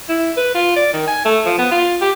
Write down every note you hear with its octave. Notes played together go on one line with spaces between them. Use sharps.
E4
B4
F4
D5
D#3
G#5
A3
F3
B3
F4
G4